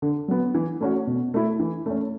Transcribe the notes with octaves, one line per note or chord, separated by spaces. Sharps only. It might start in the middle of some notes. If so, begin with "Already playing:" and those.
D3
F#3 B3
E3
A3 C#4 F#4
B2
A3 E4
E3
A3 C#4